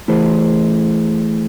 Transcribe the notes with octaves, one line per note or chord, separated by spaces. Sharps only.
E3 A3 E4 G#4 C5